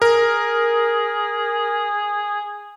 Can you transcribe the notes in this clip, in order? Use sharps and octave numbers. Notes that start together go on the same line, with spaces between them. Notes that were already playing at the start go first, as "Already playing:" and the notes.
G#4 A#4